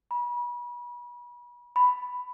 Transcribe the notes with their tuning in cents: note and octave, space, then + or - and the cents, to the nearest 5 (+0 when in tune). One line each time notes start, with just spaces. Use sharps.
B5 -35
B5 +5